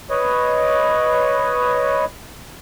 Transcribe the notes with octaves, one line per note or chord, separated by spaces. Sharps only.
B4 C#5 D#5